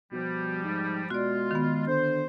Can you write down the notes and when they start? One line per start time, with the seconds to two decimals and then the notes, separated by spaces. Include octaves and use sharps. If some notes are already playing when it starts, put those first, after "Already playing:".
0.12 B2 F3 G3
0.64 G#2
1.10 B2 G#3 F4 F#4 D5
1.51 D#3 B3
1.87 D3 C5